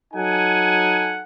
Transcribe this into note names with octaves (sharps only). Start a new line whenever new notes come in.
F#3 D#4 A4 F#5 G#5